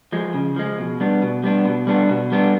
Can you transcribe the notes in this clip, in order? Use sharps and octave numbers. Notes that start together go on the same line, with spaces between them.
F3 G#3
C#3
F3 G#3
B2
G3 B3 D4
B2
G3 B3 D4
B2
G3 B3 D4
B2
G3 B3 D4